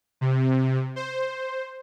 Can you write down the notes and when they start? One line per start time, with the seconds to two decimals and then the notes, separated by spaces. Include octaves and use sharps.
0.21 C3
0.96 C5